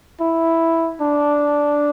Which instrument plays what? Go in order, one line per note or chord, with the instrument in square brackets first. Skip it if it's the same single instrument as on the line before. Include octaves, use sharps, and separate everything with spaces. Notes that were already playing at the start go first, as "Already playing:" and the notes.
[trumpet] E4
D4